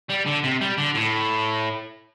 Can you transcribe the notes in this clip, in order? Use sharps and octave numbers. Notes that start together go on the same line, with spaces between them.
G3
D3
C3
G3
D3
A2